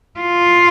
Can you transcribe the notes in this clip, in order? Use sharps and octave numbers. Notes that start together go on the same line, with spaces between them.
F4